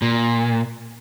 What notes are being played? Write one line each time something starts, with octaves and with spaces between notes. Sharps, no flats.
A#2